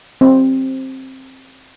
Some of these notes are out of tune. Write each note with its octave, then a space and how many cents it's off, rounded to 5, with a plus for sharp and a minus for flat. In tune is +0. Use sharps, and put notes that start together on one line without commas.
C4 +15